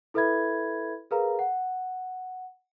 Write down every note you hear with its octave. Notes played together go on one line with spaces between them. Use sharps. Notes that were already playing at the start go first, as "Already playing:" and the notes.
E4 A4 B4 E5 B5 G#6
G#4 A#4 B4 F5 A#5
F#5